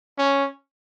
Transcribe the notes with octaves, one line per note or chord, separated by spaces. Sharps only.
C#4